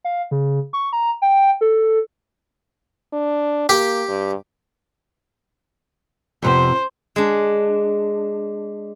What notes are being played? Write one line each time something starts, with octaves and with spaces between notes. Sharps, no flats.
F5
C#3
C#6
A#5
G5
A4
D4
A#3 G4
G2
F2 C3 B3 C5
G#3 D4